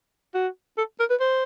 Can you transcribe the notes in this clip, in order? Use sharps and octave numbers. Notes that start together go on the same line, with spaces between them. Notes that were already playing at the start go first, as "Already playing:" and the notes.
F#4
A4
A#4
B4
C5